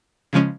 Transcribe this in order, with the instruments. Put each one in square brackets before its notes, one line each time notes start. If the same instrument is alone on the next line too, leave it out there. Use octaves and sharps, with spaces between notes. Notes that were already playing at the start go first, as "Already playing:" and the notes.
[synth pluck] C#3 F3 G#3 C#4